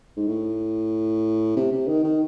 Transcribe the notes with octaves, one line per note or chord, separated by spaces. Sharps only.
G#2
A2
C3
C3
D#3
D#3